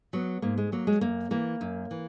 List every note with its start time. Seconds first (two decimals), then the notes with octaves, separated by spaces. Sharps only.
0.13 F#3 B3
0.42 G#2 A#3
0.58 G#3
0.72 F#3 A#3
0.87 G#3
1.01 F#2 A#3
1.31 E3 A#3
1.61 F#2
1.91 E3